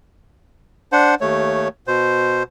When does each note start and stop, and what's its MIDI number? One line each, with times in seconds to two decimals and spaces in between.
0.92 1.15 62
0.92 1.15 72
0.92 1.15 78
1.21 1.68 39
1.21 1.68 57
1.21 1.68 73
1.87 2.43 47
1.87 2.43 72